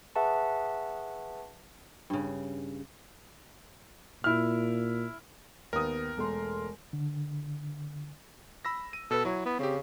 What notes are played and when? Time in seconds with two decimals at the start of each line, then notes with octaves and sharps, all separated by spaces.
0.15 G#4 B4 E5 F#5 A5 C#6
2.10 G2 C#3
4.24 A#2 E4 F6
5.73 D#2 B3 A#4 D#6
6.17 E1 A3 C6
6.93 D3
8.65 B5 E6 A#6
8.93 D#7
9.11 B2 A4 B4
9.25 F#3 E4
9.45 B3
9.59 C#3 C4 G4